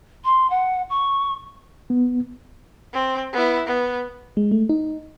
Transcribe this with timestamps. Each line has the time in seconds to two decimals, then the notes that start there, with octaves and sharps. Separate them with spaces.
0.25 C6
0.50 F#5
0.90 C#6
1.90 B3
2.93 C4
3.33 B3 E4
3.67 B3
4.37 G#3
4.51 A3
4.69 D#4